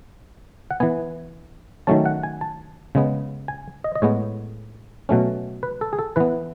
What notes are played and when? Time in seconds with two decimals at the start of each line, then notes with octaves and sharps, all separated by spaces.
0.71 F#5
0.80 E3 B3 G#5
1.87 D#3 F#3 A3 C#4 A5
2.06 F#5
2.23 G#5
2.41 A5
2.95 C#3 G#3 B3
3.48 G#5
3.84 D#5
3.95 D#5
4.02 A2 G#3 B3 C#5
5.09 B2 F#3 A3 C#4
5.63 B4
5.81 A4
5.93 G#4
5.99 A4
6.16 E3 B3 B4